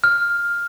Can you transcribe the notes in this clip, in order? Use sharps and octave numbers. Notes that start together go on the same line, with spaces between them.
F6